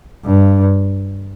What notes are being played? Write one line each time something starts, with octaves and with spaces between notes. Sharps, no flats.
G2